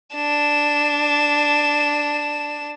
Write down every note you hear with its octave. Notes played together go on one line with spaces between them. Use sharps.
D4 E7